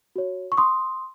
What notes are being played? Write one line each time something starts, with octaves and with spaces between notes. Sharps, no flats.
F#4 C#5
C#6
C6 D#6